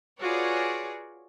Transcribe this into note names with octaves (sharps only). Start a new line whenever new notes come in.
F4 F#4 G#4 B4 C#5 D5